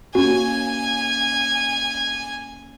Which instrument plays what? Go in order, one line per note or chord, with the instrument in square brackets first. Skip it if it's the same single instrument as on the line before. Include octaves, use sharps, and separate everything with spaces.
[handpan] A#3 C#4 [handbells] F#4 [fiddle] G#5